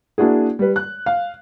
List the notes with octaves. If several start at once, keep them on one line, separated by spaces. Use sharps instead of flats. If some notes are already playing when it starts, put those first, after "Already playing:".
A#3 D4 E4 F#4 G#4
G3 B4
F#6
F5